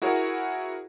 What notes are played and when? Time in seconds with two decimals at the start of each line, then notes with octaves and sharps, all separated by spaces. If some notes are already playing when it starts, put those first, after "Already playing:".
0.02 E4 F#4 G#4 A#4 C#5